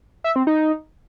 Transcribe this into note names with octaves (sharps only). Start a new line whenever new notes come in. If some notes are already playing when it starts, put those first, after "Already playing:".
E5
C4
D#4